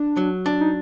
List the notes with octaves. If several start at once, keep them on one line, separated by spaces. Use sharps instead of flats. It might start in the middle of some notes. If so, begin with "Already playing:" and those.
Already playing: D4
F#3
D4
D#4